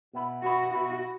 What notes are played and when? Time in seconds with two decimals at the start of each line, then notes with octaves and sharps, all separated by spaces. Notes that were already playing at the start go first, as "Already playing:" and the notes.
0.13 B2 B3 E4
0.43 B2 B3 E4 F#4
0.73 B2 B3 E4 F#4